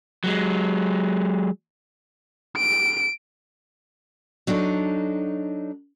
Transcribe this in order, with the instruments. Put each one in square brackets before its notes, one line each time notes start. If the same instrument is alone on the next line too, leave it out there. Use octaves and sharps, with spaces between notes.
[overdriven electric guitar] F#3 G#3
[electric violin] D7
[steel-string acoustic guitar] F#3 D4 D#4 A4